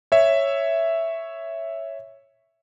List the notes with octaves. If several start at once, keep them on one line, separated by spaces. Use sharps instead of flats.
C#5 E5